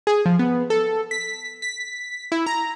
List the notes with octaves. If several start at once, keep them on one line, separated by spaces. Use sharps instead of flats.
G#4
F3
B3
A4
B6
B6
E4
A#5